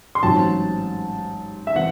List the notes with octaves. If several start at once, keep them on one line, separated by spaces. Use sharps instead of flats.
C6
A1 G#2 F#3 C4 A5
E5
E3 C4 F#5